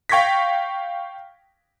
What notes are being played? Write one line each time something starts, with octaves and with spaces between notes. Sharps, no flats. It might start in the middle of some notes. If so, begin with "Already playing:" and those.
F5 G5 C#6 G#6 A#6 B6